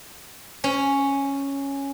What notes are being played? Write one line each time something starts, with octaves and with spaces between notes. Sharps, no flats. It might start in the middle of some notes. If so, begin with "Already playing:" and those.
C#4